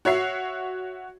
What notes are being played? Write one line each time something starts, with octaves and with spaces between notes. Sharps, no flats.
F#4 C#5 E5 C7